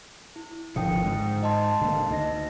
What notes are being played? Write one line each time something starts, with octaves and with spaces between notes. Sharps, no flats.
E4
G#1 D3 F3 G5 D#6 C#7
G#2
D#5 A5 C6
D3 A#3
D2 D#4 D#5 A#6